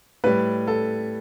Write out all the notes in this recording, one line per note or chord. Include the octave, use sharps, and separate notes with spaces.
A2 G3 B4
A4